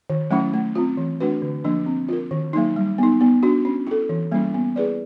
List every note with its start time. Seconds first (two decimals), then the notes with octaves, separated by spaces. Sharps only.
0.10 D#3
0.31 F#3 A3 C#4 E4
0.54 A3
0.75 C4 F4
0.97 E3
1.20 A3 D4 F#4 B4
1.42 D3
1.65 F3 A#3 D4
1.86 C4
2.08 F4 A#4
2.31 D#3
2.53 F#3 A#3 D#4
2.76 G3
2.98 B3 D#4
3.21 B3
3.43 D4 F#4
3.65 C#4
3.87 E4 A4
4.09 E3
4.31 G3 A#3 C#4 E4
4.54 B3
4.76 E4 G#4 B4 D5